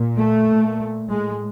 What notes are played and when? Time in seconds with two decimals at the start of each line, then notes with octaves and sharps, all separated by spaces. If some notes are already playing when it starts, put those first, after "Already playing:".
Already playing: A#2
0.18 A3
0.48 A#2
1.10 A2 G#3